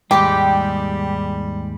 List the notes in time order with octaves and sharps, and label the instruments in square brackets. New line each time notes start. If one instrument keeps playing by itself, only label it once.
[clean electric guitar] D#2 G#2 G#3 [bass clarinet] G3 [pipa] G4 [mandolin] G5 D6 G6